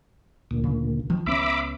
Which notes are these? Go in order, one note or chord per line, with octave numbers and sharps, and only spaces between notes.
D2 A#2
C#3
D#3 F3
C#2 B3 C#4 E5 B5 D6